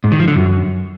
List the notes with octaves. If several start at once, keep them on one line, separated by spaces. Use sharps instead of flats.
G#2
D#3
F3
D3
F#2